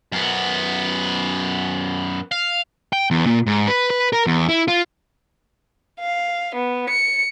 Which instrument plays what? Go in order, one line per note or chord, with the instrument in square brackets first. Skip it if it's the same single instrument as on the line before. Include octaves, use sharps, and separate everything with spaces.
[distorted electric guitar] F#2 B3
F5
[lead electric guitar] G5
E2
A#2
G#2
B4
B4
A#4
E2
E4
F4
[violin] F5
B3
C#7